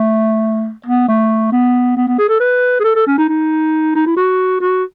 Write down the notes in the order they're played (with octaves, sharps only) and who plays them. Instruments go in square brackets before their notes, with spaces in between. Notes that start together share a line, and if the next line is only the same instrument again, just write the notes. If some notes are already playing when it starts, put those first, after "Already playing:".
Already playing: [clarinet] A3
B3
A3
B3
B3
B3
G#4
A4
B4
G#4
A4
A4
C#4
D#4
D#4
D#4
E4
F#4
F#4